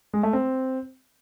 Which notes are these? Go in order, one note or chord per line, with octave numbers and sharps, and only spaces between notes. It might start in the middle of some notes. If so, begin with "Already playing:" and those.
G#3
A3
C4